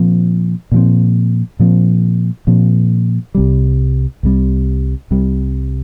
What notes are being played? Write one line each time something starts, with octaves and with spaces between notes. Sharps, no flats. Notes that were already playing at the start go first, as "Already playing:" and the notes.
Already playing: A#2 F3 C4
A#2 F3 C4
A#2 F3 C4
A#2 F3 C4
C2 C3 G3
C2 C3 G3
C2 C3 G3